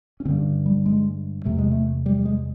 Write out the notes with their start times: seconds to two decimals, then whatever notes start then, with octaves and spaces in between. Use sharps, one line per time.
0.20 C#4
0.25 G2 D3 C4
0.66 G3
0.86 G#3
1.45 E2 C3 A3
1.59 G#3
1.71 A3
2.06 G3
2.18 G3
2.25 G#3